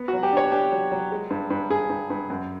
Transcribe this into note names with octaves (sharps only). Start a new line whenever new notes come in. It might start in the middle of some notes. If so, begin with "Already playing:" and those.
Already playing: B3
F#4
F#3
G4
D4 C#5
D4 G4
F#3
F#3
G#3
G2
G2
G2 G#4
G2
G2
F#2